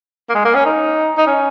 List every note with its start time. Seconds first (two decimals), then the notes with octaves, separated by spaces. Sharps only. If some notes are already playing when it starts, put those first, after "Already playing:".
0.30 A#3
0.35 G#3
0.45 A#3
0.55 C#4
0.66 D#4
1.18 D#4
1.27 C#4